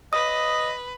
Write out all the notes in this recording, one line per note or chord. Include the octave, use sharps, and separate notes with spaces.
B4 D#5 D#6